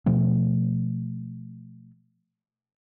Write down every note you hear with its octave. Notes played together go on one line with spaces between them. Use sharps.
B2 F3 A3